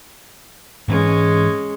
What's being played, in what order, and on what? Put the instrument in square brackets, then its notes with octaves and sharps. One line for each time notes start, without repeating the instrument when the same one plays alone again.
[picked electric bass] G#2 E3 [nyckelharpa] G#3 C#4